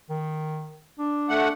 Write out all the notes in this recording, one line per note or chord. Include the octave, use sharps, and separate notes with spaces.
D#3
D4
A3 F#5